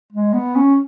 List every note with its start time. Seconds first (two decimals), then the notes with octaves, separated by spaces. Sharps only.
0.13 G#3
0.33 B3
0.56 C#4